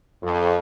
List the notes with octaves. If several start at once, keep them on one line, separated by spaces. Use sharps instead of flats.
F2